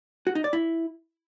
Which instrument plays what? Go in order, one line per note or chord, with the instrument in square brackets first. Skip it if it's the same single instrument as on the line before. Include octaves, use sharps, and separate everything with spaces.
[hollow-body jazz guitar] F#4
D#4
D5
E4